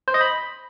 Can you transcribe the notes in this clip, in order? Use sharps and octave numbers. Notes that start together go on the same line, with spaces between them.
C5
D#5
B5